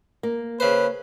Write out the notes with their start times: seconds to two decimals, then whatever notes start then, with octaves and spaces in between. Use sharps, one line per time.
0.23 A#3
0.60 C#3 B4 C5